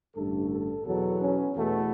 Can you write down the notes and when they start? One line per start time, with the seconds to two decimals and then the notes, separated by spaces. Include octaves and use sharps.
0.16 A1 G2 D3 A3 A4
0.51 A4
0.86 E2 B2 F#3 B3 A4
1.20 C#4
1.56 E2 B2 A3 B3